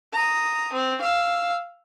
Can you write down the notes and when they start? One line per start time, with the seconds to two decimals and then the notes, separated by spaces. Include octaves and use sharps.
0.13 A#5 D#6
0.73 C4
1.02 F5 E6